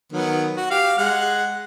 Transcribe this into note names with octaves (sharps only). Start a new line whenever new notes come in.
D#3 F#3 B3
F#4
G4 F5
G#3 F#5